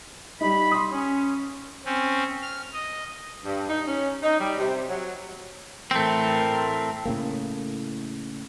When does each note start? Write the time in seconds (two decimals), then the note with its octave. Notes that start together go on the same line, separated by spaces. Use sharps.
0.41 G3 D#4 B5
0.71 C6 D#6
0.91 C#4
1.85 C4 C#4
2.42 F6
2.73 D#5
3.45 G2
3.69 D#4
3.87 C#4
4.23 D#4
4.39 G3
4.58 C3
4.89 F#3
5.91 A2 E3 A3 C4 A#4
7.05 A2 C#3 A#3